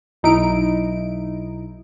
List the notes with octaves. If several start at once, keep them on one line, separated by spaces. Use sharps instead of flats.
B1 D#4 E4 D7